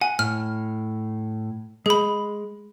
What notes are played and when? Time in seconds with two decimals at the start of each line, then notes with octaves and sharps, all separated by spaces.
0.01 F#5 G#5
0.19 A2 F6
1.86 G#3 G#4 B5